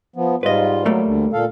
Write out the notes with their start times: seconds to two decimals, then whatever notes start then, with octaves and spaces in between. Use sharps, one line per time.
0.16 F3 B3
0.43 G#2 G3 F4 B4 D#5
0.86 F#3 G3 A3 A#3
1.06 D2 D3
1.33 A#2 A4 F5